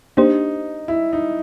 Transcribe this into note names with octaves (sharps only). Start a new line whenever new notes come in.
A#3 D4 D#4 G4 C5
E4
D#4